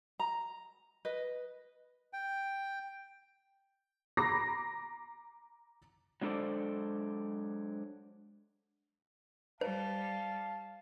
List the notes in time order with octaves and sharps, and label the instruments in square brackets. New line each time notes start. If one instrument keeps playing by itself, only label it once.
[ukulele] A#5
B4 D#5
[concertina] G5
[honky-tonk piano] A#5 B5 D6 A#6 C7
[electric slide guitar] F#3 G#3 D4 A4 C5 D5
[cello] G3 [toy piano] C5 [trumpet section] F5 A5